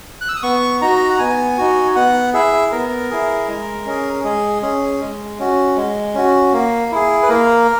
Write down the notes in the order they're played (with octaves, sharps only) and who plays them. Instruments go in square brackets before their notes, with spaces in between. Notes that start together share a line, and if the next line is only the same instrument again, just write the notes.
[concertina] F#6
E6
D#6
B3 C#6
D#4 F#4 A#5
F#5
B3 G#5
D#4 F#4
B3 F#5
E4 G#4 E5
B3 A#4
E4 G#4
G#3
C#4 G#4
G#3 G#4
C#4 G#4
G#3
C#4 F#4
G#3
C#4 F#4
A#3
E4 G#4
B4
A#3 A#4